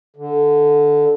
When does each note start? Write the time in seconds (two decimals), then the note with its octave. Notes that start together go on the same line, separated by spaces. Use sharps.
0.16 D3